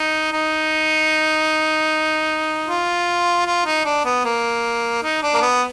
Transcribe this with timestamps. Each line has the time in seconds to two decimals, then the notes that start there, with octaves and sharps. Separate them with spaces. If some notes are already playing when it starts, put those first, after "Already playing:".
Already playing: D#4
0.32 D#4
2.68 F4
3.46 F4
3.65 D#4
3.85 D4
4.05 B3
4.25 A#3
5.03 D#4
5.23 D4
5.34 A#3
5.42 B3